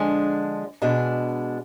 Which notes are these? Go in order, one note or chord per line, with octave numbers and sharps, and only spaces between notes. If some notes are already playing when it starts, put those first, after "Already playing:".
Already playing: D3 F3 G#3 D4
B2 G#3 D4